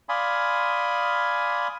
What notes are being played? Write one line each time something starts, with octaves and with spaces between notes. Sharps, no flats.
D5 F5 G#5 B5 C6 D#6